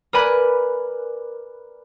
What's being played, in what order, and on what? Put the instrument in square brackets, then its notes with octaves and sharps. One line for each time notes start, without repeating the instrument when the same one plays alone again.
[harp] A#4 B4 D5 G#5 B5 F#6